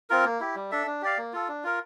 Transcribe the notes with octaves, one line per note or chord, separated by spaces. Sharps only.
C4 F4 A#4
A#3
E4 G4
G3
D4 A4 E5
D4
G4 D5 F5
A#3
F4 A4
D4
F4 A#4